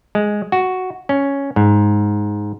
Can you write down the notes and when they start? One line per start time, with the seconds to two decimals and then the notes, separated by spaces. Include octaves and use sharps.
0.15 G#3
0.52 F#4
1.09 C#4
1.56 G#2